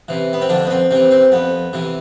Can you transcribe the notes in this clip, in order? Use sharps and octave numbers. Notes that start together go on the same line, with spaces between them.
C3 E3
B3
C4
F2 D3 D4
B3
C4
C3 E3 C4
C4
F2 B3
C3 E3